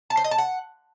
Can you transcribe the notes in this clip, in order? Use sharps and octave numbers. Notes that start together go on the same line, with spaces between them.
A5
C5
D#5
A5
F#5